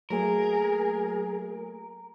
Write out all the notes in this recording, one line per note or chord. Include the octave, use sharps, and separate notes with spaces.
F#3 A3 A#3 G#4 A#4